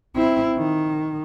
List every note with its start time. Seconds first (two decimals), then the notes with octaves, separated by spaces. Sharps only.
0.16 C4 E4
0.57 D#3